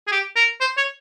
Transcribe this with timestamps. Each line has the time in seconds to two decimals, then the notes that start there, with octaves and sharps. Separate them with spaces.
0.07 G#4
0.12 G4
0.36 A#4
0.61 C5
0.77 C#5